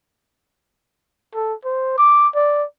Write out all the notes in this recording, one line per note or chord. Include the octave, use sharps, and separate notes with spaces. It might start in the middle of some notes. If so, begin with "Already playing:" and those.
A4
C5
D6
D5